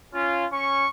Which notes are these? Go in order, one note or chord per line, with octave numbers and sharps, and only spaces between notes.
C#4 F4
C#4 C#6